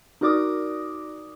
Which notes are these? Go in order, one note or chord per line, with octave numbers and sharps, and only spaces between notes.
D#4 F#4 A#4 D5 D6 D#6